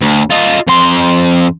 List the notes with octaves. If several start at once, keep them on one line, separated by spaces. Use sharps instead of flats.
D2
F4 D#5
F2 C6